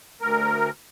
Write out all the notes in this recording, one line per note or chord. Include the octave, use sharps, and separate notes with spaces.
D2 A#4